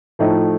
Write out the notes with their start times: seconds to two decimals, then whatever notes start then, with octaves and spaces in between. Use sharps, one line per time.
0.19 A2 F3 A3 D#4